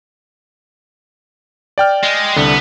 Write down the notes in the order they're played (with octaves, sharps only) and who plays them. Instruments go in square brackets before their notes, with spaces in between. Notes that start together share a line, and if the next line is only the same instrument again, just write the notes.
[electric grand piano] D5 G5 F6
[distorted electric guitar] G#3
[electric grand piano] C2 D3 [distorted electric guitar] B3